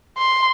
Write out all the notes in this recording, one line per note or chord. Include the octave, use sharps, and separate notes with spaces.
C6